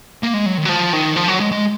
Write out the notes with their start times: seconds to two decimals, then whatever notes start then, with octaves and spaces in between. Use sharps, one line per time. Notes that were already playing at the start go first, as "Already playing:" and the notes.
0.23 A#3
0.34 G#3
0.46 F#3
0.57 D#3
0.65 F#3
0.69 F3
0.93 D#3
1.16 F3
1.28 F#3
1.40 G#3
1.51 G#3